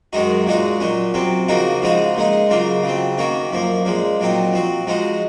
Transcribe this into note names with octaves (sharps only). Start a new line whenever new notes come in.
F#2 D#3 G#3 D#4 F#4
A#2 G#3 D#4 F#4
A#2 F#3 C#4
C3 F#3 C4
C#3 F3 A#3 D#4 F#4
C#3 F3 G#3 D#4 F#4
A#2 G#3 D#4
C#3 F#3 A#3 F4
C#3 F#3 C4
D#3 A#3 C#4 F#4
F#2 F3 A#3
A#2 F3 G#3
A#2 F#3 C4 D#4
F3 C4 F#4
F3 G#3 D#4 F#4